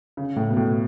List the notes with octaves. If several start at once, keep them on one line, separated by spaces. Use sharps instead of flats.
C#3
A2
B2
A2